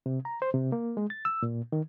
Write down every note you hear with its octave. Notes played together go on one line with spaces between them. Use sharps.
C3
A#5
C5
C3
A#3
G#3
A6
E6
A#2
D#3